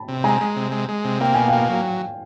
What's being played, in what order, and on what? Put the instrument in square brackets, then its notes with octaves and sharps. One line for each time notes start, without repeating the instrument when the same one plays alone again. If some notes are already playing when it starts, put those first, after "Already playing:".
Already playing: [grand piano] A5 B5
[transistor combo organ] C3
[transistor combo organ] G#3 [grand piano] G#5 A#5
[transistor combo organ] G#3
C3
G#3
G#3
C3
[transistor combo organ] A#3 [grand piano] G5
[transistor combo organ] B2 [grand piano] G#5
[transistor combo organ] A#3 [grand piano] F5 G5
[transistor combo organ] F#3